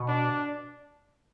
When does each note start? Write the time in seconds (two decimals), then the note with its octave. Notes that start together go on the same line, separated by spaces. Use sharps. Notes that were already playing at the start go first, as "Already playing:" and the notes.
Already playing: B2
0.08 D4